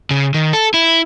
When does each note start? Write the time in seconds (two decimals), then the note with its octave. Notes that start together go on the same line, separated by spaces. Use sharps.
0.11 C#3
0.34 D#3
0.53 A4
0.74 E4